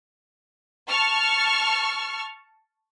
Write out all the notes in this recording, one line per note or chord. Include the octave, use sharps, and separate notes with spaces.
A5 C#6 F6